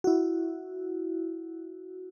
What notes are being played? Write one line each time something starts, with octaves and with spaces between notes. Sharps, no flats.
E4 F#4